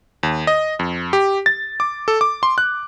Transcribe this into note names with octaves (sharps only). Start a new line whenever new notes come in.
D#2
D#5
F2
G4
A6
D6
A4
D6
C6
F#6